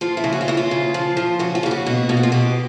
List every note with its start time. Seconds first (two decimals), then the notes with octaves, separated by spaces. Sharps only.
0.01 F3 F4
0.17 E4
0.24 C#3
0.33 F#4
0.41 F4
0.48 C#3 E4
0.57 F4
0.71 C#3
0.94 F3
1.17 F3
1.39 C#3 F#4
1.55 F4
1.63 C#3 G4
1.71 F#4
1.86 B2 F#4
2.09 B2 F4
2.17 F#4
2.23 F4
2.32 B2 G4